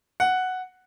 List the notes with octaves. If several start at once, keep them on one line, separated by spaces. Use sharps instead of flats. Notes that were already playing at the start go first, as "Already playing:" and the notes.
F#5